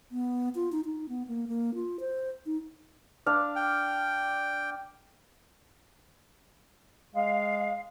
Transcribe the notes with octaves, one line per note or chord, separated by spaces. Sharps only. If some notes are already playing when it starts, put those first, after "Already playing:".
B3
F4
D#4
D#4
B3
A#3
A#3
F4
C5
D#4
D4 F5
G5
G#3 F5